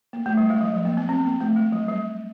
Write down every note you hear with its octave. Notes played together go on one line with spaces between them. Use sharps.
A#3
A3
G3
G#3
F#3
F3
A#3
B3
C4
A#3
A3
G#3
F#3
G3